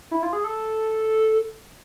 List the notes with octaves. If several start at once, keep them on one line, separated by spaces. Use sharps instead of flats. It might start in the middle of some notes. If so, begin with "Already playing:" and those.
E4
F4
G#4
A4